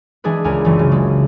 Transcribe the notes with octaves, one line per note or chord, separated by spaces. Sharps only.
E3 G#3 D4 G#4 B4
C#2 A#4 G#5
F#1 E3
C#3
G#3